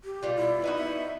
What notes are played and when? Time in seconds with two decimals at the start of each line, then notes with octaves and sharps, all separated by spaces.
0.04 G4
0.22 B2 G3 F4
0.37 E4
0.63 B3 D#4 F#4
0.76 E5